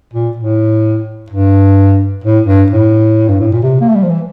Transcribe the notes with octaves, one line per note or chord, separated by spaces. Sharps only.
A#2
A2
G2
A2
G2
A2
G2
A2
A#2
C3
A#3
A3
G3
F3
E3